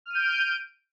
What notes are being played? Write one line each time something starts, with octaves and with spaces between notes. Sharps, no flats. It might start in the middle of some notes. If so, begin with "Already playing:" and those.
F6 G6 D7 D#7